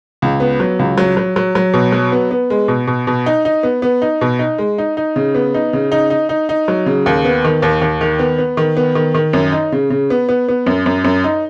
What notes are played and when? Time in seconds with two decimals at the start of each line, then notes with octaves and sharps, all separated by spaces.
0.22 C#2
0.40 B3
0.60 F#3
0.79 C#2
0.98 F#3
1.17 F#3
1.36 F#3
1.55 F#3
1.74 B2
1.92 F#3
2.12 B3
2.31 B3
2.50 G#3
2.68 B2
2.87 B2
3.07 B2
3.26 D#4
3.45 D#4
3.63 B3
3.82 B3
4.02 D#4
4.21 B2
4.39 D#4
4.58 G#3
4.78 D#4
4.97 D#4
5.16 C#3
5.35 B3
5.54 D#4
5.73 C#3
5.92 D#4
6.10 D#4
6.29 D#4
6.49 D#4
6.68 F#3
6.86 C#3
7.06 D#2
7.25 B3
7.44 D#3
7.62 D#2
7.81 D#2
8.01 D#3
8.19 B3
8.39 B3
8.57 D#3
8.77 B3
8.95 D#3
9.14 D#3
9.33 F#2
9.52 D#4
9.72 C#3
9.90 C#3
10.10 B3
10.29 B3
10.49 B3
10.66 F#2
10.86 F#2
11.04 F#2
11.24 D#4